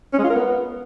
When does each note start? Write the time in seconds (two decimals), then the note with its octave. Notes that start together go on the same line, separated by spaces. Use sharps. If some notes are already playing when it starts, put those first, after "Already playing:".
0.13 C#4
0.19 G#3
0.24 F4
0.30 A#4
0.35 B3